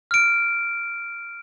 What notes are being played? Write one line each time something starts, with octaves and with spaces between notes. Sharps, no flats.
F6 D7